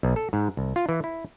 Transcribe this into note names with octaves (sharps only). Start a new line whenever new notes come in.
B1
A4
G#2
C2
F4
E3
E4